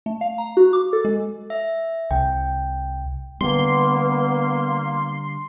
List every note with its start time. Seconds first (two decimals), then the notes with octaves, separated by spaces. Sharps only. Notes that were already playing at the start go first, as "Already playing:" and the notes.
0.06 A3
0.21 F5
0.38 A#5
0.57 F#4
0.73 D6
0.93 A4
1.05 G#3
1.50 E5
2.11 C2 G5
3.41 D3 G3 A#3 B3 C6